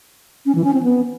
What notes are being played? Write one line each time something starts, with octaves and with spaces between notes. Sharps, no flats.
C#4
E3
C#4
C4
B3